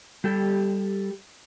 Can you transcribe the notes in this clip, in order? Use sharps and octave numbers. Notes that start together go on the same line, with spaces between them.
G3 G4 A4